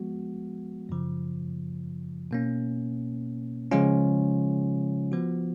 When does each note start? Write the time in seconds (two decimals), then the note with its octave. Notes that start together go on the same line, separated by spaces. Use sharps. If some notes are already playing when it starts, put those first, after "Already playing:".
Already playing: F3 G#3 B3 F#4
0.89 F#2 C#3 F3
2.31 B2 A#3 C#4
3.72 C#3 F3 G#3 C#4 F4
5.12 F3 B3 F#4